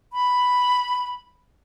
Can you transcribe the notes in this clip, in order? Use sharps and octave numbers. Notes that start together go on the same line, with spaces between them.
B5